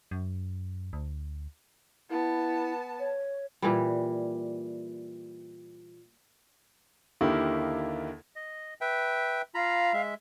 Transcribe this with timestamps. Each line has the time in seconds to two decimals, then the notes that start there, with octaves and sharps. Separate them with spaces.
0.11 F#2
0.93 D2
2.10 B3 E4 A5
3.00 C#5
3.62 A#2 E3 G3
7.21 D#2 D3 D#3 A#3 E4 G4
8.36 D#5
8.81 B4 E5 G5
9.54 F4 F5 A#5 B5
9.93 G#3 E5